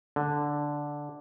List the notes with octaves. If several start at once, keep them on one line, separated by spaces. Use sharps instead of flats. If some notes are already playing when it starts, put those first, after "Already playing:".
D3